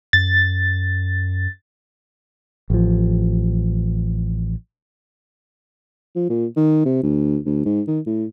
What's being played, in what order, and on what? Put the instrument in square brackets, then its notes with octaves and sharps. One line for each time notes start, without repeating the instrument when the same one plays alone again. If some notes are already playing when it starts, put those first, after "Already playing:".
[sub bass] F#2 [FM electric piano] A6
[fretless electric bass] A1 F3
[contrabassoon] F3
A#2
D#3
C3
D2
D2
G#2
D#3
A2